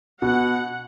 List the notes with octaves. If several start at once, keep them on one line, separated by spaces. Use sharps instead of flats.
B2 F#5